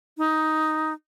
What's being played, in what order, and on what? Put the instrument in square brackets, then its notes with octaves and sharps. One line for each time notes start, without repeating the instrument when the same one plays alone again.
[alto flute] D#4